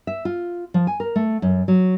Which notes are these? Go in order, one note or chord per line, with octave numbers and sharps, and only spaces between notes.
E5
F4
F3
G#5
A#4
A3
F#2
F#3